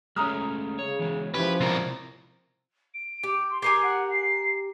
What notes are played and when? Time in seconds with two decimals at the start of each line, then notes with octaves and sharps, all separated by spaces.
0.16 G#3 A3 C#4 A#5 D#6 F6
0.79 C#3 C#5
0.99 E3 G#3
1.34 F3 C#4 E4 G4 B4
1.61 C3 F4 A#4
2.94 D7
3.23 G4
3.50 C6
3.62 G4 A#4 G#5 C7
3.83 F#5
4.11 C7